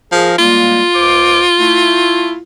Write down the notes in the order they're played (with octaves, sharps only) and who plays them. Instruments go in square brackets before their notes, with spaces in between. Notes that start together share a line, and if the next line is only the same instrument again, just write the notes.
[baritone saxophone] F3 [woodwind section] G#4 A#4
[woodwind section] G3 G#3 A#3 [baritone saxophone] F4
[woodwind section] C#2 C5 D6
A3 E4